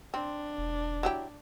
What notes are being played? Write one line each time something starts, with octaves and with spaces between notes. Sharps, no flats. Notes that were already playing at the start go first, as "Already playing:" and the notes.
C4 D4
E1
F#3 E4 G4